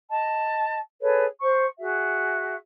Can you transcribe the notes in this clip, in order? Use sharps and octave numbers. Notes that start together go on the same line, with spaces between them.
D#5 A5
G#4 A4 B4 C#5
C5 C#6
F#4 G#4 E5